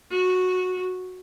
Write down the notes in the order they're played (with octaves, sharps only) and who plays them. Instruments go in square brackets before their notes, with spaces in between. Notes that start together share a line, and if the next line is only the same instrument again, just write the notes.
[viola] F#4